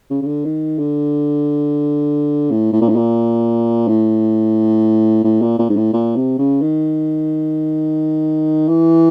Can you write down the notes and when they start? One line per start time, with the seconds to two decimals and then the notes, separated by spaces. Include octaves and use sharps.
0.11 C#3
0.22 C#3
0.27 D3
0.45 D#3
0.79 D3
2.51 A2
2.73 A2
2.81 A#2
2.89 A2
2.96 A#2
3.88 A2
5.24 A2
5.42 A#2
5.59 A#2
5.69 G#2
5.77 A2
5.93 A#2
6.16 C3
6.39 C#3
6.62 D#3
8.68 E3